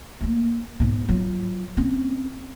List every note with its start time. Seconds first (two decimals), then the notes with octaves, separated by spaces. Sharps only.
0.21 A3 A#3
0.80 G#2 B3
1.09 F#3 F4
1.77 C4 C#4